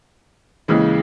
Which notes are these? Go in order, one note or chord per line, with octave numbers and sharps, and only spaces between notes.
D#2 C#3 E3 G#3